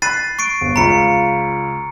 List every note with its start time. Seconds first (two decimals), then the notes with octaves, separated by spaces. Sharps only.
0.02 B5 F#6 A6 C7 D#7
0.39 C#6 C7 D7
0.61 G1
0.76 C#2 F4 A#5 B5 C#7